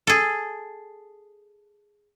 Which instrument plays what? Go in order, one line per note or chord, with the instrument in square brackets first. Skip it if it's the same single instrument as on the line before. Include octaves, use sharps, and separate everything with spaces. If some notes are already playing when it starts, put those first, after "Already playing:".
[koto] G#4 A4